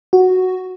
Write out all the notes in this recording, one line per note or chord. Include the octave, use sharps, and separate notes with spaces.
F#4